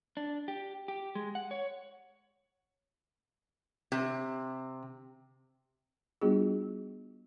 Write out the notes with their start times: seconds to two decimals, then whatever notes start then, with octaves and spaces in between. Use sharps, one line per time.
0.17 D4
0.48 G4
0.88 G4
1.15 G#3
1.35 F#5
1.51 C#5
3.92 C3
6.21 G3 B3 D4 F4 F#4 G#4